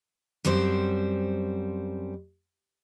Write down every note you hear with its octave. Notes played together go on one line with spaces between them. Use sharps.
F#2 G3 C4 C5